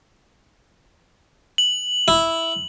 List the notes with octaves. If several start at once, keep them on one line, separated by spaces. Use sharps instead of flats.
F#7
E4